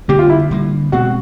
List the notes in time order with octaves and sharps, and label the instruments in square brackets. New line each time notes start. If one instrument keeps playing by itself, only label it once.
[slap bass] D3 G3 A#3 [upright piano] G4
[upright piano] F4
E4
[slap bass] D3 G3 A#3
[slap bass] B2 G#3 C4 [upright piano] F#4